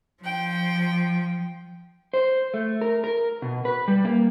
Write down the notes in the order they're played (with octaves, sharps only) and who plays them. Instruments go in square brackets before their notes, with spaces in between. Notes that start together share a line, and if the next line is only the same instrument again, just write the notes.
[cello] F3 [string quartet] G5
[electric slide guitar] C5
A3
A#4
A#4
B2
B4
G3
A#3